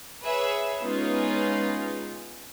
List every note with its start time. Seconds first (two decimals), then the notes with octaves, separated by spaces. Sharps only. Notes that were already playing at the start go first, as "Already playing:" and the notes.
0.24 G#4 B4 C#5 E5
0.82 G#3 B3 C#4 D#4 F4 G#4